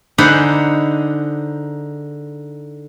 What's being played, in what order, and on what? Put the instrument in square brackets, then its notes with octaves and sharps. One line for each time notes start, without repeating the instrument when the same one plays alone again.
[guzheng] D3 D#4 G#4 C5 F#5 B5